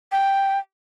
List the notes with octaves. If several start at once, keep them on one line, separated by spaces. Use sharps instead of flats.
G5